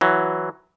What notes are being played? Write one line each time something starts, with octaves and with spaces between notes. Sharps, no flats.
E3 F#3